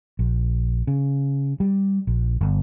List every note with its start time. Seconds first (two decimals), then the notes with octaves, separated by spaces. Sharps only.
0.19 A#1
0.87 C#3
1.60 G3
2.07 A#1
2.41 G1